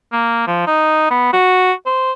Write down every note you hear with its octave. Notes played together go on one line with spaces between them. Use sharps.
A#3
F3
D#4
B3
F#4
C5